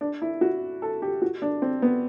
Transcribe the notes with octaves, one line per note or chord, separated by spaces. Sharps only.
D4
E4
F#4
A4
G4
F#4
D4
C4
B3